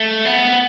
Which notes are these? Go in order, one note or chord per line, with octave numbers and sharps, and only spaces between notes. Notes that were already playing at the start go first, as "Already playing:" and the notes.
Already playing: A3
B3